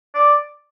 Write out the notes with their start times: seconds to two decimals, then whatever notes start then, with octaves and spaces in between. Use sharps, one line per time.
0.14 D5